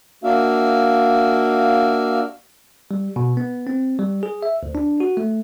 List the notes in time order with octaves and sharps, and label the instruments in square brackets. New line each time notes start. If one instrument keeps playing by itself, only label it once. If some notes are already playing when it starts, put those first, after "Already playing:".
[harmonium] A#3 D4 F#4 E5 F5
[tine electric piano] G3
B2
B3
C4
G3
G#4
E5
D2
D4
F#4
A3